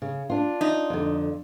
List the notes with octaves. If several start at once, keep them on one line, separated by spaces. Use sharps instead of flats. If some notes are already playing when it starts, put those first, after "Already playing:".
C#3
D4 F4
D#4
F2 D3